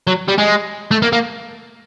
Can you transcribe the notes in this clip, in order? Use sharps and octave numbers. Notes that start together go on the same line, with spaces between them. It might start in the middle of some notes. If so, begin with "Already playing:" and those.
F#3
G3
G#3
A3
A#3
A#3